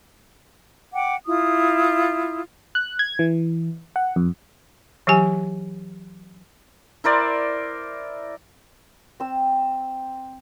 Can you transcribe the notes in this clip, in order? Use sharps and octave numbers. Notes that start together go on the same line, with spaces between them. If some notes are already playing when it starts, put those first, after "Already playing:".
F#5 G5 D6
E4 F4 D#6
F#6
G#6
E3
F#5
F2
E3 F#3 G4 G#5
E4 A#4 C5 D5
C4 E6